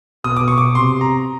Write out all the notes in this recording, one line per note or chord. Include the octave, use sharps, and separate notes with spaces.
B2 D#6
D6
C#6
D6
C3 C6
A#5